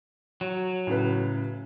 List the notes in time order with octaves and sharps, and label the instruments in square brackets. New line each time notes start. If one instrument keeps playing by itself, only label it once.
[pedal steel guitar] F#3
[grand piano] A2 C#3 B4